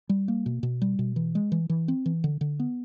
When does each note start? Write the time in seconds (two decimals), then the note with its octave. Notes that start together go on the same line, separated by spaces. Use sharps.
0.09 G3
0.28 A#3
0.46 B2
0.63 B2
0.82 G3
0.99 B2
1.16 E3
1.35 G#3
1.52 E3
1.69 E3
1.88 C4
2.06 E3
2.24 D3
2.41 D3
2.60 B3